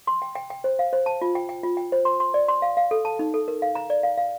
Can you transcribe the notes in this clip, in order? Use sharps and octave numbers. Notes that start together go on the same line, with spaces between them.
C6
G5
G5
G5
C5
F5
C5
A5
F4
G5
G5
F4
G5
C5
C6
C6
D5
C6
F5
F5
A4
A5
D#4
A4
A#4
F5
A#5
D5
F5
F5